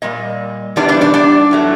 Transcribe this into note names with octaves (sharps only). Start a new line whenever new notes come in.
A#2 G3 D#5
C3 E3 G3 B3 D4 D5
D4 D5
D4 D5
D4 D5
A2 F#3 A3